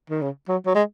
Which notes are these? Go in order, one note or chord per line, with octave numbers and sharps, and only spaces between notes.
D#3
C#3
F#3
F#3
G#3